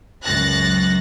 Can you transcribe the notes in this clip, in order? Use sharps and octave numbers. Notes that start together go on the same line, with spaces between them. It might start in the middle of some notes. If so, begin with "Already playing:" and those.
C#2 F#2 F#6 A6 A#6